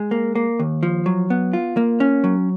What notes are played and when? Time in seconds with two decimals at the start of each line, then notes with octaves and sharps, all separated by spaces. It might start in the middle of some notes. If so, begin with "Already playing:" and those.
Already playing: G#3
0.11 A#3
0.35 A#3
0.60 D#2
0.83 F3
1.06 F#3
1.30 B3
1.53 F4
1.77 A#3
2.00 C#4
2.24 F#3